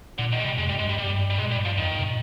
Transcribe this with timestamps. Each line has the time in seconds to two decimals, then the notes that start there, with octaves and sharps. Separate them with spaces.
0.18 A#2 D3
0.32 D#3
0.40 G#3
0.45 C3 G3
0.58 F2 G#3
0.69 G3
0.72 G2
0.79 G#3
0.85 G2 G3
0.98 G2 G3
1.30 G3
1.38 A#2 G#3
1.51 G3
1.58 G2
1.65 F3
1.78 F2 D#3
1.92 G2
1.99 C3
2.04 A#2